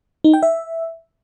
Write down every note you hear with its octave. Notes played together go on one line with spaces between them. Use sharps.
D#4
G5
E5